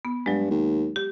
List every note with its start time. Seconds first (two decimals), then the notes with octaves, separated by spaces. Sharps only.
0.05 B3
0.26 G2 F#3 G#3
0.51 D#2
0.96 G4